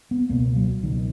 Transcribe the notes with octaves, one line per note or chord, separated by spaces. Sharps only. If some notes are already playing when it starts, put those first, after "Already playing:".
B3
C#2 B2 A#3
F#3
C#2 B2 D#3